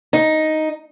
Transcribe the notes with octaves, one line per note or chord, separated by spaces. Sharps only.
D#4